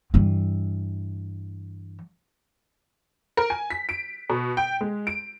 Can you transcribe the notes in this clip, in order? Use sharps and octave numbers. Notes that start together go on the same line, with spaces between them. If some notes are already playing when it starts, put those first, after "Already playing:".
G2 E3
A#4
G#5
B6
D7
B2
G5
G#3
D7